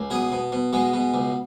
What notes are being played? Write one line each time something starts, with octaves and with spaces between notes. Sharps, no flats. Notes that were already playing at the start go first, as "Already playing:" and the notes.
Already playing: C#2
B2 G#4
B2
B2
B2 G#3
B2
C#2